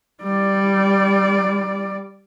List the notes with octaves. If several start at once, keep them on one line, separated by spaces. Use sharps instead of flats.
G3 D5